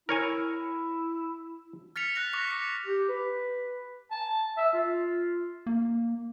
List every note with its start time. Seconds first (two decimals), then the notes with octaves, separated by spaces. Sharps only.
0.09 E4 A#4 C#5 G#5
1.96 F6 A6 B6 C#7 F7
2.15 F6 F#6 A#6 F7
2.33 C#6 D6 F#6 A#6 B6
2.48 A#6 C#7
2.86 G4
3.09 B4
4.11 A5
4.57 E5
4.73 F4
5.66 A#3